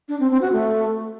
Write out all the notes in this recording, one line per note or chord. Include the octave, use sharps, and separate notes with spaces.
D4
C4
C4
F#4
A3